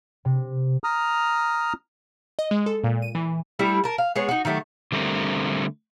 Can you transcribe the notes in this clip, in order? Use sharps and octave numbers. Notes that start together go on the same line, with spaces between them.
C3
A#5 D#6 F6
D#5
G#3
A4
A#2
D#7
E3
G3 A3 D4 E4
A#4 A5
F5
G#3 B3 G#4 C#5
D#4 F#4
D#3 F#3 A3 G4
D3 G3 A3 C4 A#4